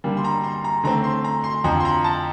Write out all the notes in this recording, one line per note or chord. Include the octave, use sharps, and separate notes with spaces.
D3 G3 A#3
C6
A#5
C6
A#5
D3 A3 C4 A#5
C6
A#5
C6
F2 D3 F3 A#5
C6
A#5
A5